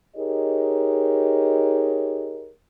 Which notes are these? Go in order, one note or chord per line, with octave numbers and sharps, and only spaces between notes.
D#4 G4 G#4 A#4 C#5 D#5